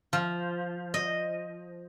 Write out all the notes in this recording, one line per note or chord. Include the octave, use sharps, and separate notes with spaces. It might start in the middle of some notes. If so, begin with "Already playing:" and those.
F3
D#5